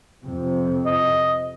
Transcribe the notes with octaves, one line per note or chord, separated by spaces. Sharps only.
F2 C3
D#5